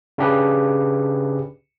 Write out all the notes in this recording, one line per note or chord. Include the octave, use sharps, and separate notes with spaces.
C#3 D4 G4 G#4 B4